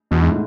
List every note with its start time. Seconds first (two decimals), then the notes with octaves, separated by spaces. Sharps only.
0.11 E2 B2
0.21 G#2
0.31 A2